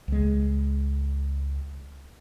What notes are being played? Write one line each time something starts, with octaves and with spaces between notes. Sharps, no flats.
C#2 G#3